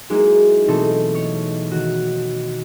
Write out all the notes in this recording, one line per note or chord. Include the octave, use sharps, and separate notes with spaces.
F#3 G#3 A#3 D#4 E4
B2 E3 A3 C4 D#4 A4
C#5
D#3 F#4